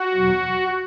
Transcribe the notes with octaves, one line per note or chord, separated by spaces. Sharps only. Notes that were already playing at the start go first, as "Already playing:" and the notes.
Already playing: F#4
E2 B2 F#3